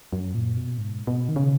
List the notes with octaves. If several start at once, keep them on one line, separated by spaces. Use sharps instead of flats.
F#2
A#2
B2
G#2
B2
D#3
C#3